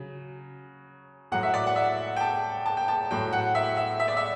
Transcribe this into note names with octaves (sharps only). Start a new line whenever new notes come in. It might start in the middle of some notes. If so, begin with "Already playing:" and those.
Already playing: C#3 F#3
A2 F#3 F#5
E5
D5
F#5
E5
G5
A5
A5
G5
A5
A2 F#3 G5
F#5
E5
E5
E5
D5
E5